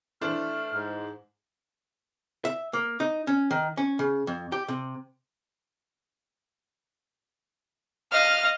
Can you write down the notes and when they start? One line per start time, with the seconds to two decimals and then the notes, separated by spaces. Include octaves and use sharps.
0.22 E3 A3 D4 C5 F6
0.74 G#2
2.45 E5
2.73 A#3
3.00 D#4
3.27 C#4
3.51 D#3
3.77 C#4
3.99 C#3
4.27 F2
4.52 G4
4.68 C3
8.12 D#5 F5 F6